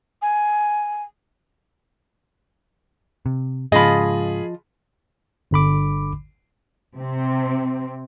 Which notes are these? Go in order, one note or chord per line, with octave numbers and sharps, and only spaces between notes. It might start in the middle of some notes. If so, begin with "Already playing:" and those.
G#5
C3
G#2 C#3 F3 F4 G#4 D#5 B5
G1 D3 B5 D6
C3 C4